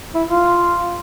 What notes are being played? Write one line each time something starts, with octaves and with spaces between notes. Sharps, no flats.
E4
F4